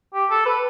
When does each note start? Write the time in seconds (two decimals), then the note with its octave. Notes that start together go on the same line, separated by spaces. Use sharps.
0.14 G4
0.30 A4
0.46 B4